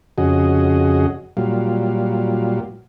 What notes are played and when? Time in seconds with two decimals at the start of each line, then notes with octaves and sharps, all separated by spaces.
0.18 F2 C#3 F#4 G#4 D#5
1.37 A#2 F#3 G3 F4